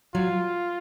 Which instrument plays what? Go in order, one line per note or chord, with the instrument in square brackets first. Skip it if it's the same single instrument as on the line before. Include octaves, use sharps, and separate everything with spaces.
[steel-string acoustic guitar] F#3 [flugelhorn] F4